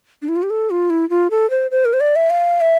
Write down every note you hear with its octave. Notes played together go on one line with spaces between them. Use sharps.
D4
E4
F4
G4
A4
F4
E4
F4
A4
C5
C5
A#4
C5
D5
E5
F5
E5